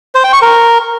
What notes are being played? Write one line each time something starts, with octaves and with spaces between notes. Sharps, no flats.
C5
G5
C#6
A#4